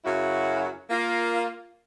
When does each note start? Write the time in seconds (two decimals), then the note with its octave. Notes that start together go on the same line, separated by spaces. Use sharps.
0.05 F#2 C#3 F#3 E4 F#4
0.90 A#3 F4